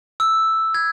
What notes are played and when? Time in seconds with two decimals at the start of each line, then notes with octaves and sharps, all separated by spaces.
0.20 E6
0.74 G#6